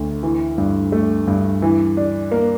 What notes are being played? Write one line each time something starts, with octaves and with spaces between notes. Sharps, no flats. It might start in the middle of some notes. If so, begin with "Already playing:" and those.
Already playing: D2
E3
G2
A3
G2
E3
D4
A#3